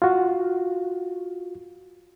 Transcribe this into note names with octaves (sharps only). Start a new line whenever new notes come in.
F4 F#4